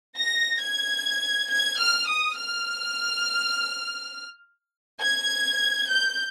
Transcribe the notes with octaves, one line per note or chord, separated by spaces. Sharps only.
A#6
G#6
G#6
F6
D#6
F6
G#6
G6